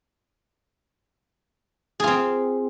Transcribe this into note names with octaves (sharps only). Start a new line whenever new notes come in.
C4 F4 G#4